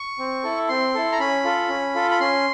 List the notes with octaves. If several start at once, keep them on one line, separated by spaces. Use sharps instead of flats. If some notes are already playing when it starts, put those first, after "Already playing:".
Already playing: C#6
C4
E4 A4
C4 C6
E4 A4
A#5
C#4 B5
F4 A4
C#4
F4 A4
B5
C#4 C6